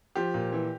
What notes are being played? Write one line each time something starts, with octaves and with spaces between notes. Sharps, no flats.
F3 G4
A#2
E3